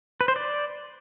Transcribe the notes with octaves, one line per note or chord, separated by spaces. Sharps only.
B4
C5
D5